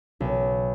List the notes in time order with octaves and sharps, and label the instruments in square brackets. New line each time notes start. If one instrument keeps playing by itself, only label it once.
[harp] B1